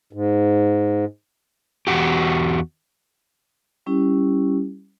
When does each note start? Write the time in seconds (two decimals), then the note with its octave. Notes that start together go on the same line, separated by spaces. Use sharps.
0.13 G#2
1.87 E2 A#2 F#4 G4
3.86 G3 C#4 E4 G4